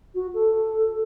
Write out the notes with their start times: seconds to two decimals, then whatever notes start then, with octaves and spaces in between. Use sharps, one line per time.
0.15 F#4
0.34 A4